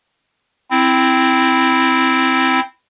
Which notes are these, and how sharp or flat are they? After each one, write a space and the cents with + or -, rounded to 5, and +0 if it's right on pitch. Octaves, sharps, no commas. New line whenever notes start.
C4 +0 E4 +0